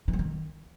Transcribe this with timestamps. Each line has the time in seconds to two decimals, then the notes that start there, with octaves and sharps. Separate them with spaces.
0.08 E3
0.13 F#3
0.19 D#3